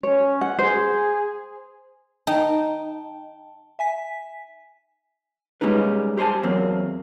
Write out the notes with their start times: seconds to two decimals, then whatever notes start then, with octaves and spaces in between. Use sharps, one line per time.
0.03 C#4 C#5
0.41 F#5
0.59 G#4 C5
2.27 D#4 G5 A5
3.79 E5 G#5 B6
5.61 G3 G#3 A#3 C#4 D#4 B4
6.17 G4 C5 C#5 G#5 A5
6.43 E2 F#3 A#3 C4